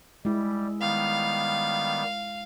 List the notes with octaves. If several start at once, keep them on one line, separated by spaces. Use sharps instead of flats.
G3 G#3 E4
D#3 G3 B3 F5